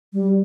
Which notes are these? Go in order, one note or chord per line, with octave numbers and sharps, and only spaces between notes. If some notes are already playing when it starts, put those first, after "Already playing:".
G3